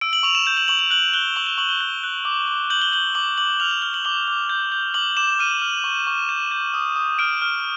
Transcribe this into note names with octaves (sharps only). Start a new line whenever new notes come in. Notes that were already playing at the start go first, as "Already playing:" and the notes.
E6 D7
F#7
C#6 F7
E7
G6 E7
F#7
C#6 F#7
F#7
F#6 F#7
F#6 G7
C#6 F#7
G7
C#6 F#7
G7
F#6
F#6
D6
D6
G6 F#7
G7
G6 F#7
D6 F#7
D6 F#7
F6 F7
F#7
F6 G7
F#7
D6 G7
D6
G6
G6
D6 F#7
D6 E7
F6 D#7
F6
C#6
C#6
G6 E7
G6
D#6
D#6
F6 D7
F6